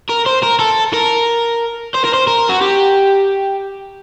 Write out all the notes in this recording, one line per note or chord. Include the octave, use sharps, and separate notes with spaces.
A#4
C5
A#4
A4
A#4
C5
A#4
C5
A#4
F#4
G4